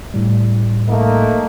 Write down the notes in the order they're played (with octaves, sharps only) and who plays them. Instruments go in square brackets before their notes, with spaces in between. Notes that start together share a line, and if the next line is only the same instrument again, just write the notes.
[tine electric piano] A2 G3
[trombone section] A3 A#3 D#4